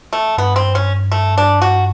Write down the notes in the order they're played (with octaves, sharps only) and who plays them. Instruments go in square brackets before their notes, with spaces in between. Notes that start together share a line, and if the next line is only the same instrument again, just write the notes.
[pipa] A3
[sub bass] G2 [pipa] B3
[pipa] C4
C#4
A3
D4
F#4